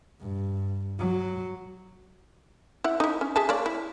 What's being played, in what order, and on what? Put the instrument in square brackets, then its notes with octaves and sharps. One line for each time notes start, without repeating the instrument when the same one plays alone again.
[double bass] G2
F#3
[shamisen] E4 F#5
D#4 E4
C#4
G#4 E5 A5
A#3 C#5 D5
E4